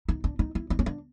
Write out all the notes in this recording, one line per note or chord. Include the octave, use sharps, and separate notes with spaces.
D#4
D4
D#4
E4
D#4
C#4
D4